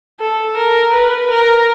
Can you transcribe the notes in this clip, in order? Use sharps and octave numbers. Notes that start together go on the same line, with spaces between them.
A4
A#4
B4
A#4